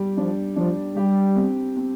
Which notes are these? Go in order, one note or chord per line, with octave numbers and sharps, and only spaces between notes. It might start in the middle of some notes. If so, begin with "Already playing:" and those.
Already playing: G3 G4
F3 D4
F3 D4
G3 G4
C4
C4